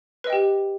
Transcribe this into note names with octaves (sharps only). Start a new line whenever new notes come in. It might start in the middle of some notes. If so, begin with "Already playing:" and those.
G4 B4 D#5 G5